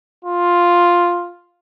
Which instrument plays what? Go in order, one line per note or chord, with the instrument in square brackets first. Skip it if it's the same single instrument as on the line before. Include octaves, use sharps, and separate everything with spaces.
[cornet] F4